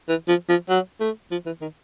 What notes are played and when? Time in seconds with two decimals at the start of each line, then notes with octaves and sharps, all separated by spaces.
0.09 E3
0.28 F3
0.49 F3
0.70 F#3
1.00 A3
1.32 F3
1.46 E3
1.62 D#3